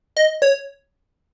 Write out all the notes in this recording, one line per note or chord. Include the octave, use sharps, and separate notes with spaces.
D#5
C#5